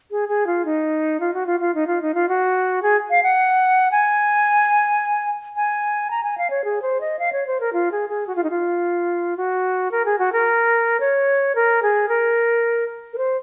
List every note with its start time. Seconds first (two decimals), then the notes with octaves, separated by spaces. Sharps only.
0.11 G#4
0.29 G#4
0.47 F4
0.65 D#4
1.20 F4
1.34 F#4
1.47 F4
1.60 F4
1.75 D#4
1.87 F4
2.02 D#4
2.14 F4
2.29 F#4
2.82 G#4
3.10 F5
3.23 F#5
3.92 G#5
5.56 G#5
6.11 A#5
6.24 G#5
6.38 F5
6.50 C#5
6.64 G#4
6.82 C5
7.01 D#5
7.19 F5
7.33 C#5
7.47 C5
7.60 A#4
7.73 F4
7.92 G#4
8.09 G#4
8.27 F#4
8.36 F4
8.44 D#4
8.50 F4
9.37 F#4
9.91 A#4
10.05 G#4
10.19 F#4
10.33 A#4
11.00 C#5
11.55 A#4
11.83 G#4
12.09 A#4
13.13 A#4
13.18 C5